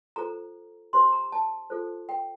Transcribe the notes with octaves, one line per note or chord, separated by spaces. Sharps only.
F4 A4 C5 A#5
D#4 G4 C5 C6
A#5
A5
F4 A4 C5
G5